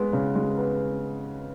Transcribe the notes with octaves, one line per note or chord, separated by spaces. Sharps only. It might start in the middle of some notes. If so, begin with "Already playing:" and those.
Already playing: G#3 B3
C#3
G#3
B3